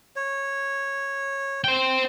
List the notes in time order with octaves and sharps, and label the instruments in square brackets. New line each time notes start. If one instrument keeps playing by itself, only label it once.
[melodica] C#5
[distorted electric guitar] C5 G5